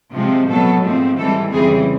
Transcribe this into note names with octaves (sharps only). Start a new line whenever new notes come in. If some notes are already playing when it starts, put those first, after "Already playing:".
C3 F3 G#3 C4
B2 F#3 B3 A4
G#2 F3 A3 C4
G#2 E3 G3 C4 A4
F2 C#3 E3 G3 C4 G#4